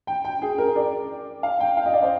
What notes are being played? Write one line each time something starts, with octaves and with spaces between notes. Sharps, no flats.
G5
G5
G#4
A#4
D5
F5
G5
F5
D#5
D5
C5